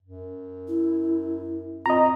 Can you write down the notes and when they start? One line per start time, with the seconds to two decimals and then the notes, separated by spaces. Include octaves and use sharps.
0.02 F#2
0.68 E4
1.86 C4 F4 D#5 A#5